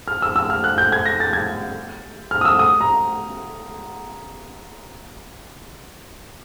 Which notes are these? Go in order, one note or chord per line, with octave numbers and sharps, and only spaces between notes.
F6
E6
E6
F6
F#6
G6
G#6
A#6
A6
G#6
F6
D#6
E6
D#6
A#5